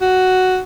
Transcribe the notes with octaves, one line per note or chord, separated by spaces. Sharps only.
F#4